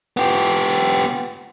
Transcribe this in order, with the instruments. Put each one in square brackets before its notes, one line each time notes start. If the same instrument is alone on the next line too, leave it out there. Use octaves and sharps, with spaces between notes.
[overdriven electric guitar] B3 G4